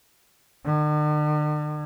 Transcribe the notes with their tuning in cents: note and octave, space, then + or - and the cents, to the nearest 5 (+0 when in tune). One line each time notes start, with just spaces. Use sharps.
D3 +45